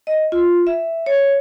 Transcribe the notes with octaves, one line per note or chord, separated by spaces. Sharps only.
D#5
F4
E5
C#5